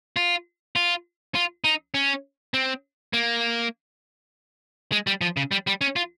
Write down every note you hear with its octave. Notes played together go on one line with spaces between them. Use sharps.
F4
F4
F4
D#4
C#4
C4
A#3
G#3
G3
F3
C#3
G3
G3
C#4
F4